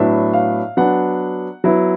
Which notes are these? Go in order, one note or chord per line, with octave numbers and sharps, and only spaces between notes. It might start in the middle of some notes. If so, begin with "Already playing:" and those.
Already playing: A2 F#3 B3 D4 E5
F5
F#3 B3 D4 F#5
F#3 B3 E4